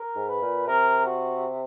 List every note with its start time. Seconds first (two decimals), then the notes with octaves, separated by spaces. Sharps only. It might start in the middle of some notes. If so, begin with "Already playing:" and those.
Already playing: A#4
0.16 G#2
0.28 B4
0.42 A#2
0.67 C3 A#4
1.05 F#4